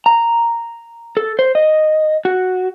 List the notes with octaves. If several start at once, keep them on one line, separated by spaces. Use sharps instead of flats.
A#5
A4
C5
D#5
F#4